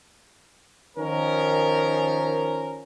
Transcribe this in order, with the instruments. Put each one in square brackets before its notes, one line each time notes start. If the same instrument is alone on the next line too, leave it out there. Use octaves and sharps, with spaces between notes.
[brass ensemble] D#3 F3 C#4 A#4